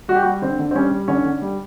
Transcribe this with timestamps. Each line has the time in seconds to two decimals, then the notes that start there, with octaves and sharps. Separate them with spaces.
0.08 G3 F#4
0.16 G4
0.23 G3 F#4
0.42 D3 C4
0.59 D3
0.71 C4
0.75 G3 C#4
0.91 G3
1.08 D3 C#4
1.24 D3
1.42 G3